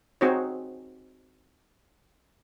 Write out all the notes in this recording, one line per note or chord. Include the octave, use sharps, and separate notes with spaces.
C4 D#4 F#4 G#4 C5 C#5